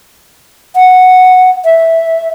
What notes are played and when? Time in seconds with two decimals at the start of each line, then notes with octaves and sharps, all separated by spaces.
0.75 F#5
1.65 E5